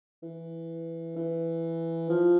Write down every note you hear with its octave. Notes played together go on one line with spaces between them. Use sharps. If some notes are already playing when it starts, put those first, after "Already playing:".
E3
E3
F3